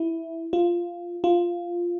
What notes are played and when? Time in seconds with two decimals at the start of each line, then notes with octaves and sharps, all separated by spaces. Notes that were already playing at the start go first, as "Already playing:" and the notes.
Already playing: E4
0.53 F4
1.24 F4